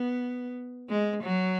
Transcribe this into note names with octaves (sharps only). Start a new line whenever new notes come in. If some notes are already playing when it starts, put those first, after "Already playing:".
Already playing: B3
G#3
F#3